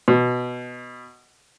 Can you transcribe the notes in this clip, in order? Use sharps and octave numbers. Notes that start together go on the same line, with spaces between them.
B2